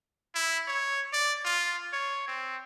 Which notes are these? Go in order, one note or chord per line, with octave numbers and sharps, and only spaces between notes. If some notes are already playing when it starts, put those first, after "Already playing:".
E4
C#5
D5
F4
C#5
C4